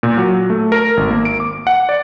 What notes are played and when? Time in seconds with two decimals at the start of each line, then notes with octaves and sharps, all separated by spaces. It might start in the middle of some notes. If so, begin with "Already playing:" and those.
0.03 A#2
0.18 F#3
0.50 A3
0.72 A#4
0.97 G#1
1.11 A#3
1.25 D7
1.40 D6
1.67 F#5
1.89 D5